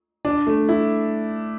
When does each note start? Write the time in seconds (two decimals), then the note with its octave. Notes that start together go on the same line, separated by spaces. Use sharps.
0.25 D4
0.47 A3
0.69 E4